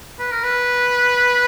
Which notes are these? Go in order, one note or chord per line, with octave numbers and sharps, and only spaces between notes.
B4
A#4
B4